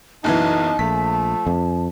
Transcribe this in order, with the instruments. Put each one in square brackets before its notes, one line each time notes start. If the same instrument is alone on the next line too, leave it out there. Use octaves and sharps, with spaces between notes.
[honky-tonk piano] F#1 B1 E3 [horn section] D#4 [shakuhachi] A5
[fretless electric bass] A#1 [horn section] F3 A3 [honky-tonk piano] B6
[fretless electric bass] F2